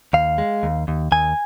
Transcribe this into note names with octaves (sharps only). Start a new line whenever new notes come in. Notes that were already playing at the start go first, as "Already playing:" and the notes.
D#2 F5
G#3
D#2
D#2
D#2 G#5